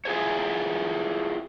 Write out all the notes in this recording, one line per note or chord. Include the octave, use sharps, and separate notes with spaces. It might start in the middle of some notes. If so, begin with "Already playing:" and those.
E4 F4 G#4 C5 C#5